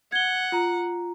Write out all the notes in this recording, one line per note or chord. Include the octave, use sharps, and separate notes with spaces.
F#5 G#6 G7
F4 A#5